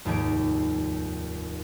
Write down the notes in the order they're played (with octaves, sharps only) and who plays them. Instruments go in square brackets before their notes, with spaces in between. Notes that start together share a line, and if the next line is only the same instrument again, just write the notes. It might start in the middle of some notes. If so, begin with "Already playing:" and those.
[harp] F1 D#2 G#2 C#5 D7